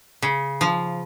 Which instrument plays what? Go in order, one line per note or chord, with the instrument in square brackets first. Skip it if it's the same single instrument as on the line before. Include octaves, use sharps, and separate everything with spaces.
[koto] C#3
F3